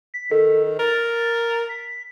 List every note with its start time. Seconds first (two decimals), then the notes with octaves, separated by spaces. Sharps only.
0.14 B6
0.32 D#3 A4
0.79 A#4 A6
1.69 B6